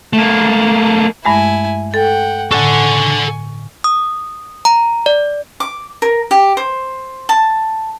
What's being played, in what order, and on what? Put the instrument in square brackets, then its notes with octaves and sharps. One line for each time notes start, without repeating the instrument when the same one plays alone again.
[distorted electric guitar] A3 A#3
[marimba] G2 G#3 A3 [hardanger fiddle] E4 G#5
[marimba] A4 [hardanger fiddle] F#5 G5
[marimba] A2 D3 [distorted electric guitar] A4 F#5 [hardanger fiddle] G#5 C#6
[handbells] D#6
A#5
D5
[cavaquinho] D6
A#4
G4
C5
A5